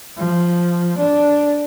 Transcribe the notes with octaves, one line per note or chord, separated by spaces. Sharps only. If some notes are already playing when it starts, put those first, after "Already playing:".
F3
D4